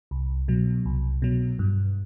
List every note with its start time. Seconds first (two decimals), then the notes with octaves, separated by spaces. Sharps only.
0.11 C2
0.48 B2 F#3
0.85 C2
1.22 B2 F#3
1.59 G2